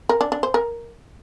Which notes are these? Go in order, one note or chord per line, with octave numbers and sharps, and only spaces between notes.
A#4
D4
D4
C5
A#4